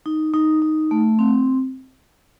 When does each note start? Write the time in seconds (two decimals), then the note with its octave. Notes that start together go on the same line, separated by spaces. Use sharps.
0.06 D#4
0.34 D#4
0.62 D#4
0.91 A3
1.19 C4